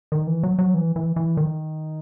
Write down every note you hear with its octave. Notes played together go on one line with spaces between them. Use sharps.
D#3
E3
F#3
F#3
E3
E3
E3
D#3